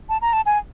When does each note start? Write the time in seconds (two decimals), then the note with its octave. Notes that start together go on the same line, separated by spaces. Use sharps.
0.09 A5
0.21 A#5
0.33 A5
0.46 G#5